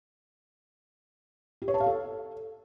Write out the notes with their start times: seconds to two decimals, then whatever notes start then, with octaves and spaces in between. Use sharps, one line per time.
1.62 G4
1.68 C#5
1.74 A5
1.80 F5
1.86 A4